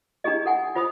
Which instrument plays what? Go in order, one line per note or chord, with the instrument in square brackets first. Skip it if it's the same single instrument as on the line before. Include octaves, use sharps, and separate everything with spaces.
[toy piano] D4 E4 G4 G#4 D#5
A4 F#5 G#5
F4 C5 B5 D#6